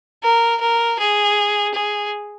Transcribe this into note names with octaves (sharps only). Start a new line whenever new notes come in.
A#4
A#4
G#4
G#4